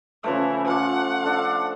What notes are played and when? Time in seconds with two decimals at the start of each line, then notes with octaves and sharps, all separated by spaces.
0.24 C#3 E3 F3 A3
0.67 F3 F#5 D6
1.24 D4 A4